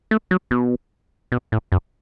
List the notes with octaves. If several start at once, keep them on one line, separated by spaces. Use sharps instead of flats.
A3
F#3
B2
B2
A2
F#2